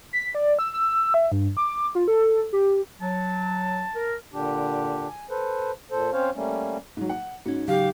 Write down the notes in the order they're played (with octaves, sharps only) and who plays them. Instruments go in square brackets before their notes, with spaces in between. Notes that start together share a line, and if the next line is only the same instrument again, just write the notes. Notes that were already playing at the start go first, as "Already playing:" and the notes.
[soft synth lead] B6
D5
E6
E6
E5
G2
D6
F4
A4
G4
[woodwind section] F#3 [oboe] A5
[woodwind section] A#4
[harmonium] A#2 D3 D4 G4
G#5
A4 B4 C5
A#2 A4 C5
C4 C#4 C5 C#5 F5
G3 A3 A#3 C#4
[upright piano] G#2 F#3
F#5
[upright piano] G#2 [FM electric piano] C#4 F#4
[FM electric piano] C#3 F#3 [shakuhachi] G4 [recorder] F5